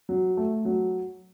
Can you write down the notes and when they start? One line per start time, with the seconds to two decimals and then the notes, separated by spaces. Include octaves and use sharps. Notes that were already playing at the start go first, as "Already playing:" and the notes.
0.09 F#3
0.37 A3
0.65 F#3